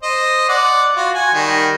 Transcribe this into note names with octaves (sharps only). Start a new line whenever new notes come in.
C5 D#5
D5 F#5
F4 F#4
F#4 G#5
D#3 G3